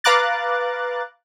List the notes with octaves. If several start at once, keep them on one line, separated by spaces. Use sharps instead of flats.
B4 F5 A#5 D6 F#6 A6